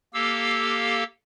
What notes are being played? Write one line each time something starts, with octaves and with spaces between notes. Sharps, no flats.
A#3 G4 A4 F5 E6